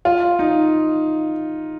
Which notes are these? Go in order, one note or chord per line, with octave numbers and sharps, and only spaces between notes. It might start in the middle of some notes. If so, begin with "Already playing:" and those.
F4
D#4